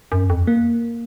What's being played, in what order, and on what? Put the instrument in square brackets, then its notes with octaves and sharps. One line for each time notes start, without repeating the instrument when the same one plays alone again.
[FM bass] F#2
F2
[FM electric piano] A#3